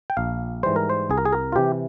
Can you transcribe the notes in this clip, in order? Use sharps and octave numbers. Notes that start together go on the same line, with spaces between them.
G5
A#1 F5
G#2 E3 G3 C5
A#4
C5
C2 G#4
A#4
G#4
A#4
F4
C3 E3 G4